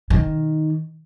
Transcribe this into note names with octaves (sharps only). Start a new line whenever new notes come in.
D#3